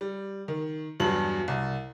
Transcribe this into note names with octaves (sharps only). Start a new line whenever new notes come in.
G3
D#3
E2 G2 F#3 A5 F#7
C2